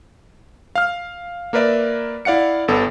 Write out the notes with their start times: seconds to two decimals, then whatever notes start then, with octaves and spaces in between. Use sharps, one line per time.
0.75 F5 F6
1.53 A#3 A#4 B4 D5 E5
2.25 E4 D5 F5 F#5 C#7
2.68 G1 B3 A4